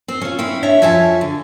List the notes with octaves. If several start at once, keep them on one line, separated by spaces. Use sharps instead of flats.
C4 C5
C#4 F4
C4 C#4 E4
D4 C#5 E5
F2 F4 C#5 E5 G#5 A5
D3